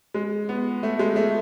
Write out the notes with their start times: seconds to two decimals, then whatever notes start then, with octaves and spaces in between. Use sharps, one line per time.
0.14 G#3
0.49 B3
0.83 A3
0.99 G#3
1.16 A3